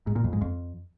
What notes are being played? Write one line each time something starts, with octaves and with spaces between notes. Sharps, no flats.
G#2
A#2
F2
G#2
F2